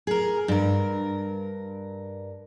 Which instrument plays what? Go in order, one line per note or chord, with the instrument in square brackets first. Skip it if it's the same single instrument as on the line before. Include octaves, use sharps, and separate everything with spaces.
[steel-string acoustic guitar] G#4 A#4
G2 A#4